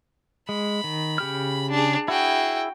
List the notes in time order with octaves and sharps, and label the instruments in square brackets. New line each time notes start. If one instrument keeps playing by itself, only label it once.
[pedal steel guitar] G#3 [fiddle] B5
[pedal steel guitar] D#3
C#3 G4 F6
[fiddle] D4 G#4
[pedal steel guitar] E4 G#4 [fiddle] F#4 G5